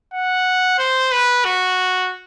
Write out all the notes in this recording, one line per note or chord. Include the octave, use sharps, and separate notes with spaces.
F#5
C5
B4
F#4